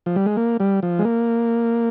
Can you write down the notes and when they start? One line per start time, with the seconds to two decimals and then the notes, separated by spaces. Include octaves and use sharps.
0.06 F3
0.16 G3
0.26 G#3
0.37 A#3
0.60 G3
0.83 F3
0.99 G#3
1.04 A#3